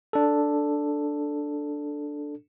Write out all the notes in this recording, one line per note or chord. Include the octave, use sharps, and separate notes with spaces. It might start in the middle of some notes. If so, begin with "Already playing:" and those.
D4 A4